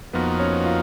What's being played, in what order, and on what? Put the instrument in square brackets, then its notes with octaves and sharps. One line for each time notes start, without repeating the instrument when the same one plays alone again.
[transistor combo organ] F2 F3 A#3 D#4 F#4 [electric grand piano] B3 B4
[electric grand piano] C#4 C#5
F4 F5